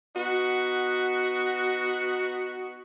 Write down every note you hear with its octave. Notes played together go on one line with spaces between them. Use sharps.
B3 D#4 F#4